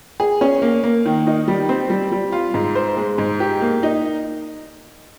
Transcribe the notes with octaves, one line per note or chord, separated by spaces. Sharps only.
G#4
C#4
A#3
A#3
D#3
D#4
G3
C4
G3
G3
F4
G#2
C5
G#3
G#2
G4
A#3
D#4